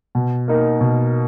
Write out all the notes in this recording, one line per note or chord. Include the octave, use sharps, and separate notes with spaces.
B2
A#3 D#4 A#4
B2